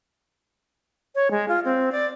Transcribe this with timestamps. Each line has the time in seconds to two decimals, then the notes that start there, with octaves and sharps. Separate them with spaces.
1.15 C#5
1.31 G#3
1.48 F4
1.65 C4
1.92 D5